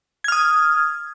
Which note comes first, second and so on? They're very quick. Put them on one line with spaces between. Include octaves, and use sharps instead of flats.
G#6 F6 D#6